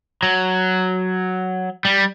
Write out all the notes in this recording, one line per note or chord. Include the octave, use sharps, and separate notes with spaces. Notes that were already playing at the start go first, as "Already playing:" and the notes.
F#3
G3